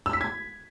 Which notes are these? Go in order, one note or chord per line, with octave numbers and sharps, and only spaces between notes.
E6
B6
G#6